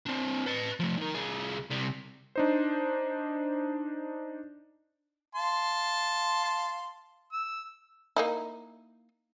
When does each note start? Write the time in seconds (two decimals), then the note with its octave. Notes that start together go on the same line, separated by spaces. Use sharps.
0.06 C4 D4
0.46 B4 A5
0.80 F3 A3
0.97 D#3 A#4
1.15 C2 G#4
1.70 C3 G3
2.36 D4 D#4 C5
5.35 F5 A5 C6
7.33 E6
8.16 A#3 D#4 E4